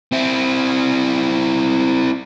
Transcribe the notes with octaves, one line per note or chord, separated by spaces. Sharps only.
C4 E4